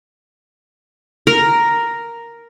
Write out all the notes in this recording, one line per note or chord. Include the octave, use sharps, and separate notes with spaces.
A#4